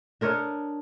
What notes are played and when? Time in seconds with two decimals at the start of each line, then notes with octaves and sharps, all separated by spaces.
0.21 D4 A#4 C#5 D#5